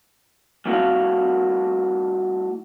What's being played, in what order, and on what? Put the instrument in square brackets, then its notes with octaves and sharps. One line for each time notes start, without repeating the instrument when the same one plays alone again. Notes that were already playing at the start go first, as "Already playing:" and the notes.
[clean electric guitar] G3 A3 E4 F#4 A4 F5